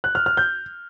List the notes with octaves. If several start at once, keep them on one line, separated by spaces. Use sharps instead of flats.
F#6
F6
F6
G6